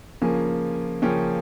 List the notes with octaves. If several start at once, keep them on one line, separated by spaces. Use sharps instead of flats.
C#3 F3 A#3 C#4 G#5
C#3 F3 A#3 C#4 G5